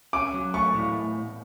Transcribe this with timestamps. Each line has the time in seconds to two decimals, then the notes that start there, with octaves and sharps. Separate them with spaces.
0.13 C#4 D6
0.34 F#3
0.54 A3 C#6
0.74 A2